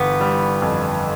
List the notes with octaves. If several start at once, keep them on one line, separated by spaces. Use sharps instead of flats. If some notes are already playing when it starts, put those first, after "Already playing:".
Already playing: G1 E3 B3
G3
F2